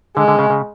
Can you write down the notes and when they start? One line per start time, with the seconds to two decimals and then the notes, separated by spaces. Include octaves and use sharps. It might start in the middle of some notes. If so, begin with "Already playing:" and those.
0.17 D3 G#3
0.28 D3
0.39 C#3
0.50 C#3